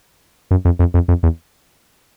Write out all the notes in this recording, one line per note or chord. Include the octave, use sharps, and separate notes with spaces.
F#2
F2
F2
F2
F2
E2